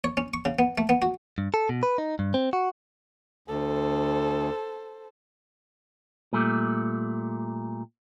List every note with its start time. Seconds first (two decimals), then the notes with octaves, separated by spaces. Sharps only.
0.04 C#5
0.17 C#4
0.34 C#6
0.45 C#3
0.59 B3
0.78 A3
0.89 B3
1.02 F#4
1.38 G2
1.54 A4
1.69 B2
1.83 B4
1.98 D#4
2.19 G2
2.34 C4
2.53 F#4
3.48 D2 A4 C5
6.33 A#2 G3 A3